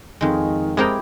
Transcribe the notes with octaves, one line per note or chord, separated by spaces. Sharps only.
F2 D#3 G#3
G#3 C4 E4 G4 A#4 D#5